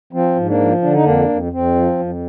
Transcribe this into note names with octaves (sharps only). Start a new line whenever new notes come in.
F3 C4
G#2
A#3 D4
F3
D3 D4
D#4
F2 A#3 D4
F2
F2 C4
F3
F2